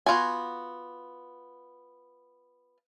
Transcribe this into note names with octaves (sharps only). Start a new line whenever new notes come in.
B3 F4 F#4 G#5